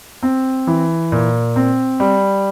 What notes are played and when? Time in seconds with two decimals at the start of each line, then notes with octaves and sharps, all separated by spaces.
0.23 C4
0.67 E3
1.12 A#2
1.56 C4
2.00 G3